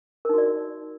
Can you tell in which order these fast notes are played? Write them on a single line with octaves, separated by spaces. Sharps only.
A#4 D#4 F#4 D5